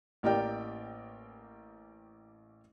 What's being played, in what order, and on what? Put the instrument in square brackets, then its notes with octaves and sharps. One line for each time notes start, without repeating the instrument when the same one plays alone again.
[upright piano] A1 A#3 G4 A#4 D5 G5